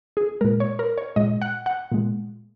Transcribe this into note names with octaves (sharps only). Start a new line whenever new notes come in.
G#4
A#2 G#3 A#4
C#5
A#4
C#5
A#2 G#3 D#5
F#5
F#5
A#2 G#3